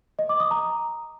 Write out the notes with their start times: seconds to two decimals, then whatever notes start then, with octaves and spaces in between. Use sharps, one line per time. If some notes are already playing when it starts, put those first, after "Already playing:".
0.19 D#5
0.29 D6
0.40 D#6
0.51 A#5